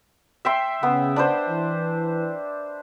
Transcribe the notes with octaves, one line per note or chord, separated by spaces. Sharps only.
E5 G5 C6
C#3 B3
D4 B4 C5
E3